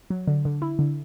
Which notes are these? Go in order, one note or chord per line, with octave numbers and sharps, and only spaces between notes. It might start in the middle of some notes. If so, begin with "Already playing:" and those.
F#3
D3
D3
E4
D3